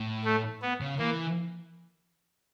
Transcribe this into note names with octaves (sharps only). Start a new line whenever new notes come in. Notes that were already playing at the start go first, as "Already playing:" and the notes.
Already playing: A2
A3
B3
C#3
E3 A#3